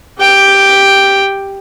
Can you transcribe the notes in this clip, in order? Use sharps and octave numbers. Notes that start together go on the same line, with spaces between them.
G4 G5